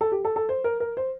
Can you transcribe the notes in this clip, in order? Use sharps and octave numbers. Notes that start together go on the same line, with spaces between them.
A4
G4
A4
A4
C5
A#4
A#4
C5